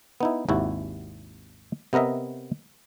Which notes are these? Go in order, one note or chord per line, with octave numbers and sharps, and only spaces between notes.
B3 D#4 E4
G#1 D#2 C3 E4 F#4
C3 B3 A#4 D#5 E5